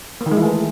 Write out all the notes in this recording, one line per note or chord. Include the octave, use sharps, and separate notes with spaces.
A#3
D#3
G#3
E3
A3